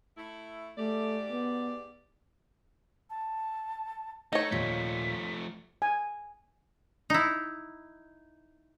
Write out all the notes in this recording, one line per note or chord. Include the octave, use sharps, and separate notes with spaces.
A3 E4
G#2 A3 G4 D5
B3
A5
A3 D#4 C#5 A#6
D#2 A#2 F3 A3 B6
G#5
D#4 E4